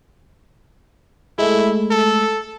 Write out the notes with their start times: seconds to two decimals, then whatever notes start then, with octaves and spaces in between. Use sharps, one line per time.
1.39 G#3 A3 E4
1.91 A4